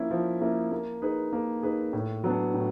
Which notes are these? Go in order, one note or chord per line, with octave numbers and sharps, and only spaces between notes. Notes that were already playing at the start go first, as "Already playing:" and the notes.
Already playing: F3 A#3 C#4 E4
F3
A#3 C#4 E4
A#3
D#4 G#4 B4
A#3
D#4 G#4 B4
A2
F#3 B3 D4
A2